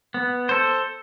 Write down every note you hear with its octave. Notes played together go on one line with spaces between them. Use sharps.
B3
A4 C5